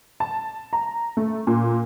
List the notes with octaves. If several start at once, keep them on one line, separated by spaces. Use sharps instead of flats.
A5
A#5
A3
A#2